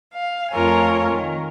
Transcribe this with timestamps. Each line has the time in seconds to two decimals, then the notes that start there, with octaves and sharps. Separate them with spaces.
0.13 F5
0.51 F2 A3 F4 A#4 C#5 G#5
1.14 D#3